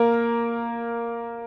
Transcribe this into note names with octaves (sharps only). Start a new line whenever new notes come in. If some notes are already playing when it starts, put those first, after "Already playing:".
Already playing: A#3 A#4